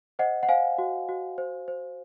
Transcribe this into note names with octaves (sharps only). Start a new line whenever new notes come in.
C5 D#5 F#5
F#5
C5 F5 G#5
F#4
F#4
C5
C5